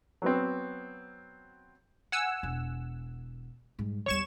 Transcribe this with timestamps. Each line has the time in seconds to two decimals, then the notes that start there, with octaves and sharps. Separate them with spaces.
0.22 F#3 B3 C4
2.12 F#5 G#5 E6
2.43 E1
3.79 G#2 G3
4.06 E2 G3 C#5 C#6 E7